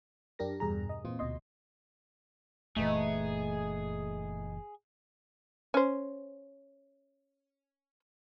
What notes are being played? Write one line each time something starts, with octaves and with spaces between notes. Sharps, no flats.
F#2 D4 G4 A#4 A#6
E2 G2 B2 G#4 A#5
D#5
A#2 E3 C4 F4
D2 B2 D#5 C6
F#1 A#2 E3 A3 B3 D#4 G#4
C#4 C5